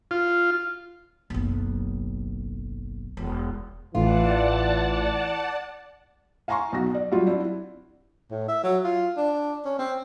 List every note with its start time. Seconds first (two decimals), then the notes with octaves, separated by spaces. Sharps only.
0.11 F4
1.30 F#1 B1
3.17 E1
3.95 A1 A2 E3 F4 D5 F#5 A5
6.48 F5 G#5 A#5 C6 C#6
6.73 B1 F#4 A#6
6.94 D5
7.11 F#3 G3 E4 F4
7.27 C4 D4 E4
8.31 A2
8.48 E5
8.64 F#3
8.84 F4
9.17 D4
9.65 C#4
9.79 C4